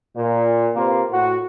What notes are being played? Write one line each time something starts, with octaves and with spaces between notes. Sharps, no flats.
A#2
C3 A#3 C4 F4 B4
A2 F#4